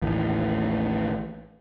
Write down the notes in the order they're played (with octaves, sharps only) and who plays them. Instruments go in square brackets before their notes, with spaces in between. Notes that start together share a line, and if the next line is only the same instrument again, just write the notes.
[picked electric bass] A1 D#2 A2